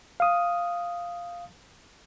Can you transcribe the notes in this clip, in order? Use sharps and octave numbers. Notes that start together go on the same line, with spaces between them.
F5 D#6